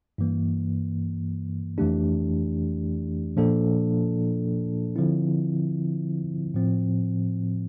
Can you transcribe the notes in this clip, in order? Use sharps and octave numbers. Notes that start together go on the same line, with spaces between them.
G2 E3 A#3
F2 E3 A3 D4 G4
A#2 F3 A#3 D4 A4
D3 F3 C4 E4
A2 F3 C4